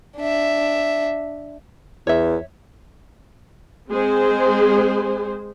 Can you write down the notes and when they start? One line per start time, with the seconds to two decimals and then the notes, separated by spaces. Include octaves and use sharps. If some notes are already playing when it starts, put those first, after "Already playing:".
0.17 D4 E5
2.07 E2 C#5 E5
3.90 G#3 C4 G#4 C5